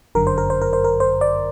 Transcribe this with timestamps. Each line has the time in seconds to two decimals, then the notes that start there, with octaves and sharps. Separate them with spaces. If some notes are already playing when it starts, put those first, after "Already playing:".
0.15 G1 F#2 D3 A#4
0.27 C5
0.38 A#4
0.50 C5
0.61 A#4
0.73 C5
0.84 A#4
1.00 C5
1.21 D5